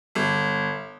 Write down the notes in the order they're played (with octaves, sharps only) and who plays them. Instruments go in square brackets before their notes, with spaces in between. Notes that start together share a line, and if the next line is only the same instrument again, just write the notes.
[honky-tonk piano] G1